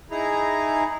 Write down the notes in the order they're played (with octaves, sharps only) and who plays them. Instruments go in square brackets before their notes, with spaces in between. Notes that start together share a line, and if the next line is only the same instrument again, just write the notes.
[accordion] D#4 E4 G#4 A#5